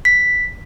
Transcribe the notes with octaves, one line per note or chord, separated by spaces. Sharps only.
B6